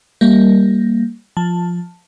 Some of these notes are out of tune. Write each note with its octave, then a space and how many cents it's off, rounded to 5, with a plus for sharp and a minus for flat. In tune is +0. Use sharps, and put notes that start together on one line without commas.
G3 +0 A#3 +0
F3 +5 A5 +5